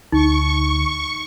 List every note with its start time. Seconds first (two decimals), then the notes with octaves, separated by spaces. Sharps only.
0.12 D2 D#4 C#6